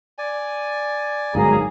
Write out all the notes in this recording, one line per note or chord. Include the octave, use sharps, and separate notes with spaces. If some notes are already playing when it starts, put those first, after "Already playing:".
D5 G#5
G1 G#2 F#3 A#3 G#4 A#5